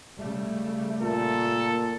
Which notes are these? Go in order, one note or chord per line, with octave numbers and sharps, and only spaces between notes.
C#3 G3 A3
A#2 A4